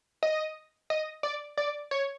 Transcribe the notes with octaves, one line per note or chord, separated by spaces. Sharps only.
D#5
D#5
D5
D5
C#5